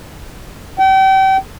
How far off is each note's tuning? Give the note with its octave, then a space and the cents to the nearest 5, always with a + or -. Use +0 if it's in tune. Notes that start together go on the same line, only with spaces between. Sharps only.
G5 -35